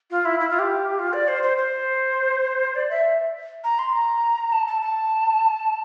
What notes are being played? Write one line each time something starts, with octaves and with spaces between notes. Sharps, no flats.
F4
E4
E4
F4
G4
F4
D5
C5
C5
C5
D5
E5
A#5
C6
A#5
A5
A5
A5